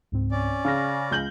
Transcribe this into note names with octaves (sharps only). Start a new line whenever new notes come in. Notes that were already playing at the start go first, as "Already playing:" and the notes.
C#2 G#2 C4
C#4 D5
C#3 F5 F6 A#6
C#2 G6 F#7